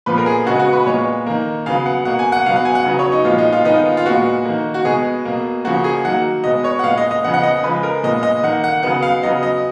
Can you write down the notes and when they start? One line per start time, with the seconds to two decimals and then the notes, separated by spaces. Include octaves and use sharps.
0.06 A#2 F3 B3 B4
0.18 A#4
0.26 G#4
0.46 C#3 G#3 B3 F#4
0.59 F#4
0.73 B4
0.86 A#2 G#3 B3 C#5
1.26 D#3 A#3
1.66 C#3 F#3 B3 F5
1.86 F#5
2.05 B2 A#3 F#5
2.19 G#5
2.32 F#5
2.46 B2 F#3 B3 F5
2.56 F#5
2.65 G#5
2.75 F#5
2.85 C#3 F#3 B3
2.99 C#5
3.12 D#4
3.25 A#2 F3 G#3 B3 F4
3.38 D#4
3.52 F4
3.65 D#3 G#3 B3 D#4
3.85 F4
3.97 F4
4.06 A#2 G#3 B3 F#4
4.45 D#3 A#3
4.74 F#4
4.84 B2 G#3 B3 G#4
5.25 B2 A#3
5.64 C#3 F3 A#3 F#4
5.84 G#4
6.05 D#3 F#3 A#3 F#5
6.44 B2 G#3 B3 D#5
6.64 C#5
6.79 F#5
6.83 A#2 G#3 B3 F5
6.98 D#5
7.11 D#5
7.23 C#3 F3 B3 F#5
7.34 F#5
7.43 D#5
7.63 C#3 F3 G#3 B4
7.83 A#4
8.03 A#2 G#3 B3 D#5
8.23 D#5
8.43 D#3 A#3 F#5
8.64 F#5
8.83 C#3 F#3 B3 F#5
9.02 F5
9.23 C#3 F#3 B3 D#5
9.43 D#5